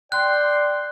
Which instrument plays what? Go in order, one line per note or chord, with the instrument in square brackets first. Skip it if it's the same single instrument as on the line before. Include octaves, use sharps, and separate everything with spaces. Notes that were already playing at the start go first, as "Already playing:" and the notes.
[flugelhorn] D5 [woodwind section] G5 C6 [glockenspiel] F#6